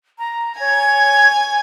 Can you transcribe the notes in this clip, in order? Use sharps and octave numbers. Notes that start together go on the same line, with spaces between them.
A#5
C#5 G#5